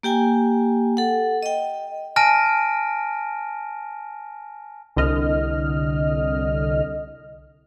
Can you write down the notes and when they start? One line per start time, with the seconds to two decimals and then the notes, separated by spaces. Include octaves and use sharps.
0.03 A#3 G4 G5 G#5
0.97 A4 F#5
1.43 D#5 G5
2.16 G#5 A5 F6 A#6 D7 D#7
4.97 C2 D3 D#5 F6